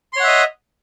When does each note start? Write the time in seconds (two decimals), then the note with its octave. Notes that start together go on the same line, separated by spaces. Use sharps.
0.13 C6
0.16 C#5
0.20 F#5
0.24 E5
0.27 D#5